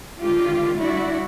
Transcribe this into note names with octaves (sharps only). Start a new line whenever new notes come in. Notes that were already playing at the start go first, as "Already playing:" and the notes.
D3 D#3 G#3 F4 G4
G3 D4 E4 F#4